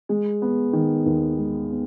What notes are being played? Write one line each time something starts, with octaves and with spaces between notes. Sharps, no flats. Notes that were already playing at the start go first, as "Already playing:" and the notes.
G#3
B3
D#3
D#2
G#3
B3